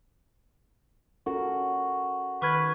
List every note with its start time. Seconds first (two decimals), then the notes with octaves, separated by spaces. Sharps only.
1.26 C#4 F#4 A4 A#4
2.42 D#3 B4 C#6 F6 G#6